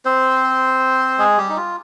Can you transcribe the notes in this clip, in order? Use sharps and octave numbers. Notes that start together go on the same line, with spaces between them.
C4 C5
G#3 G#4
G3 G4
D#4
F4